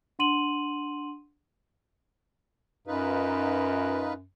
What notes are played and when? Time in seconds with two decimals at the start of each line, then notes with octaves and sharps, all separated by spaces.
0.19 D4 F#5 C6 D#7 F#7
2.87 F#2 D#4 F4 B4